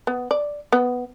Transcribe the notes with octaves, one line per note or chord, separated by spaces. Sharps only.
B3
D5
B3